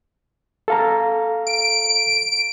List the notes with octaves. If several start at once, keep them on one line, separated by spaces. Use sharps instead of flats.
A4 F5 A#5
D7